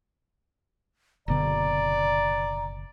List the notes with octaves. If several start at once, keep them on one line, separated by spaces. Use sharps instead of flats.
F#1 B2 D3 D5 A#5